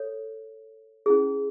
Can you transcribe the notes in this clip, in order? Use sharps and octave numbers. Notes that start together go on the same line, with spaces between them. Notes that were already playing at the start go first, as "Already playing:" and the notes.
Already playing: A4 C#5
C#4 E4 G#4